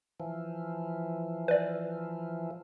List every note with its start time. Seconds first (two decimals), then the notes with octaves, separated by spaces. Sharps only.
0.20 E3 F3
1.48 B4 D5